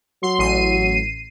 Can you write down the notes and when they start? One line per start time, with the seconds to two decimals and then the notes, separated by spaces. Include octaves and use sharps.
0.23 F#3 C6
0.39 A1 C7 D#7